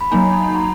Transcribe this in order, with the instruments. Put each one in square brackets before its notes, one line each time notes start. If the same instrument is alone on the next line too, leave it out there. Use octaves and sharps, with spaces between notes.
[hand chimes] B5
[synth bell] F#3 A#3 D#4 [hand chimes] G#5 A#5
[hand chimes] A5 B5
A#5 C6